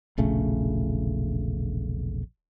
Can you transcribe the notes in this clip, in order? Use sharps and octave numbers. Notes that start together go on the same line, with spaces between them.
E1 A#1 C#3 A3